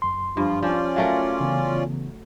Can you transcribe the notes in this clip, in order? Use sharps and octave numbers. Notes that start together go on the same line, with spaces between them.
F#2 C6
G2 F3 F4
F3 C#4 F4 D5
F#3 A3 A#4 F5
C#3 E3 B3